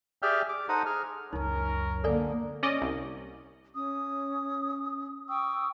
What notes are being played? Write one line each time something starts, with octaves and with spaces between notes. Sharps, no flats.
G4 G#4 D5 E5 G5 F6
D6
D#4 A4 C5 F#5 A#5 D#6
G#4 F6
C#2 F#2 C#4 D#4 A#4
D3 A#3 A4 D5 G#5
C#4 D5 D#5
C2
C#4 D#6
G5 C#6 D#6 E6